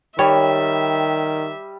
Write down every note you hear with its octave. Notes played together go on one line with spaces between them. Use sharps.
D#3 G3 C#5 E5